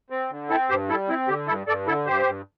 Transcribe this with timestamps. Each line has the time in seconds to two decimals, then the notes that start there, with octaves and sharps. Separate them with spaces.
0.10 C4
0.30 D3
0.50 C4 E4 A4
0.69 G2 G4 C5
0.89 G3 E4 A4
1.09 C4 E4
1.28 D3 G4
1.47 G2 E4 A4
1.67 G2 A4 D5
1.87 D3 E4 A4
2.06 G2 G4 C5
2.26 G2